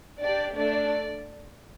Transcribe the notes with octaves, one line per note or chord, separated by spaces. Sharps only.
D4 G4 D5
A3 D4 A4 D5